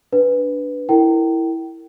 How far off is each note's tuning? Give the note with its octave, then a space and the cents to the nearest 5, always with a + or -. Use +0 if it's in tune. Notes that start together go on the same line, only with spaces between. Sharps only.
D4 -10 B4 +0
E4 +0 A#4 -30 G5 -25